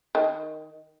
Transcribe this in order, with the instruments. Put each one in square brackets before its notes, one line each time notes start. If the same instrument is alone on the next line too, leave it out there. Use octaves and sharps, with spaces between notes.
[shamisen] D#3